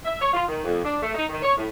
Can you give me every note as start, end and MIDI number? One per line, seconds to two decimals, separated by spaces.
0.05 0.19 76
0.21 0.32 73
0.33 0.44 65
0.49 0.63 51
0.64 0.82 41
0.85 0.97 62
1.02 1.12 57
1.14 1.24 63
1.29 1.38 51
1.42 1.57 73
1.57 1.65 45